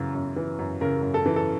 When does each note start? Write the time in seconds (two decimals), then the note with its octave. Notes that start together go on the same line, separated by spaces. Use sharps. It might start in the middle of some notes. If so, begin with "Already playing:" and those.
Already playing: F#2 C#3 E3
0.15 F#2
0.36 E3
0.59 F#2
0.81 C#3 A#4
1.02 F#2
1.14 A4
1.26 E3
1.36 A4